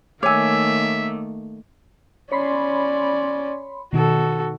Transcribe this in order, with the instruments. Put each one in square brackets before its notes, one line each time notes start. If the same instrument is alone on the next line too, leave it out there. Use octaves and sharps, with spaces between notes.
[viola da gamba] D#3 A3 A#3 [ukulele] C#5 G#5 [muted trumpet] E5 [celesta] D6 E6
[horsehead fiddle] C#4 D5 [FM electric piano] C#5 B5 C6
[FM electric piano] B2 D#3 [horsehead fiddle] F#4 A4